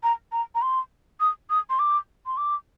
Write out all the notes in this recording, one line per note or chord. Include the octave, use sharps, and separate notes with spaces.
A#5
A#5
A#5
C6
D#6
D#6
C6
D6
C6
D6